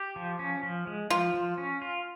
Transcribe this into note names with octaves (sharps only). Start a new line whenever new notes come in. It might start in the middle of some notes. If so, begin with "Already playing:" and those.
Already playing: G4
F3
C#4
F3
G#3
F3 F4
F3
C#4
F4